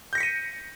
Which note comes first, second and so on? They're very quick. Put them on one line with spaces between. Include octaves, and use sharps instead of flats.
G6 A#6 C#7 B6 D#7